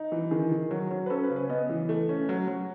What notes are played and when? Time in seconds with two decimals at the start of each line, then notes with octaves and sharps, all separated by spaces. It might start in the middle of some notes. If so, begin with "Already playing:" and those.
Already playing: D#4
0.12 E3
0.31 D#3 G#4
0.51 D#3
0.71 F#3
0.91 F#3
1.06 B4
1.10 C#4 A4
1.24 B4
1.30 C#3
1.36 B4
1.49 B3 D#5
1.70 E3
1.89 A3
2.09 C#4
2.29 F#3
2.48 F#3